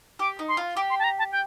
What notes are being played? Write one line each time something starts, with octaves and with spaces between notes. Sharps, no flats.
G4 D6
D#4
C6
F4
G4 D6
C6
A5
A#5
A5
G5